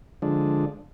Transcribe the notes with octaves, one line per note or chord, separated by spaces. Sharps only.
D3 F3 G#3 D4